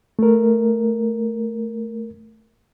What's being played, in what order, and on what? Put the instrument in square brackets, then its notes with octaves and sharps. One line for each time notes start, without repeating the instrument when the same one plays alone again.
[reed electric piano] A3 A#4